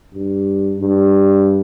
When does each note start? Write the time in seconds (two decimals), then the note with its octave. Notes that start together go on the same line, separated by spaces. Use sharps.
0.15 G2
0.80 G2